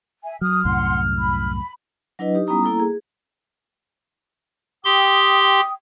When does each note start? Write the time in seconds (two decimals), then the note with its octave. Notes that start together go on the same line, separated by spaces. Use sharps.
0.24 E5 G#5
0.41 F#3 D#6 F6
0.65 C2 F#2 A2 F#5 C6
1.20 B5
2.19 F#3 D4 E4 B4 D#5
2.35 D#4 G4
2.47 G3 B3 C#4 E4 A#5 D#6
2.63 A#3 E4 A4 A#5
2.80 G#4
4.85 G4 G5 C6 D#6